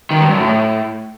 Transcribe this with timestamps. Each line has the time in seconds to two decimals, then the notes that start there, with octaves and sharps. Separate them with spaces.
0.11 D#3
0.21 G2
0.31 F#2
0.41 A2